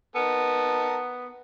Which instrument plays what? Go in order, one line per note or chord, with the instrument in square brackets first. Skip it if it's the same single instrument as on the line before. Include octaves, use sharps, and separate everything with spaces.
[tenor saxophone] B3 [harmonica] D#4 A#4 A5